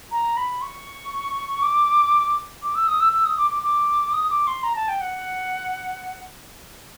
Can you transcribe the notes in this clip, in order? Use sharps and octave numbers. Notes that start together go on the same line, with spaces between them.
A#5
B5
C#6
D6
D6
E6
D#6
E6
E6
D#6
D6
D6
D6
D#6
D6
C6
A#5
A5
G5
F#5